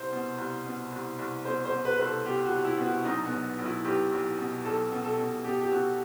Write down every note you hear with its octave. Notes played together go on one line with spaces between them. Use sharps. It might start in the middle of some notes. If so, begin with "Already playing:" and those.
Already playing: C2 C5
B2
C2
B2
C2
C2
B2 C5
C5
B2
B4
C2 B4
A4
B2 G4
F#4
C2
E4
B2
F#4
B1 D#4
B3
B1
B1
E4
B1 G4
B1
B2
B1 A4
B2
A4
B2
B2 G4
G4
B2 F#4